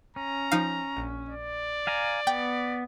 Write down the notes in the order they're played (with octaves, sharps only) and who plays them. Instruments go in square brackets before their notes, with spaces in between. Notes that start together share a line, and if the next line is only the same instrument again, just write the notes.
[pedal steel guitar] C#4 [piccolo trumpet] A#5
[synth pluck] F3 D#4 F5
A#1
[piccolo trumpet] D5
[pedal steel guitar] F5 G#5 A#5
[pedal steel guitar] B3 [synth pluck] G5